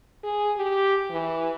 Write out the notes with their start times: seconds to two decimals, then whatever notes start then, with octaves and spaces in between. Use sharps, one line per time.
0.24 G#4
0.57 G4
1.10 E3